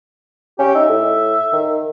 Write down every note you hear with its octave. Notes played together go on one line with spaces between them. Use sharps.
C#4 G4
D#4 E5
A2
D#3